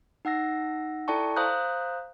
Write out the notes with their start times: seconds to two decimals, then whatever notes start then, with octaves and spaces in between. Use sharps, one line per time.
0.25 D#4 F#5 E6 A#6
1.08 E4 A4 D5 G5 A5 C#6
1.36 C5 F5 A#5 D#6 F#6 G6